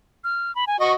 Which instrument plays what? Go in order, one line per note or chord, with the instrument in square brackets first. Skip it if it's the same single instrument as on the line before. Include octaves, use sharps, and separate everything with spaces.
[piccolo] F6
B5
G#5
[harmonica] F#4 D#5 [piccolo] C#6